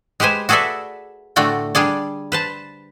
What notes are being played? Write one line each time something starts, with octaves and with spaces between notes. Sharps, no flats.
G#3 G4 B4 C5 G#5
F#4 G#4 A4 B4 D5 E5
A2 D3 A3 F#4 D5 G5
G3 D4 G#4 D5
B4 C5 A5